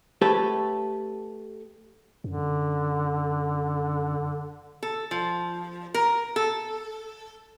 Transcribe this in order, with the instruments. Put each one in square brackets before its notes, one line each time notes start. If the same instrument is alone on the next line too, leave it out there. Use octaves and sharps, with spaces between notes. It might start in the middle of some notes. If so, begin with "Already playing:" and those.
[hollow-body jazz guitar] A3 G4 A4 B4 C#5
[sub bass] F#2 [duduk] D3
[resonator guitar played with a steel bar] A4
F3
A#4
A4